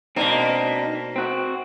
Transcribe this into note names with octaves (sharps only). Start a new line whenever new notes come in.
B2 A#3 C4 D4 D#4
C4 F#4